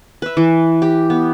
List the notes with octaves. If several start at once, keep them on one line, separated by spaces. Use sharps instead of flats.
B4 E5
E3
G4
B3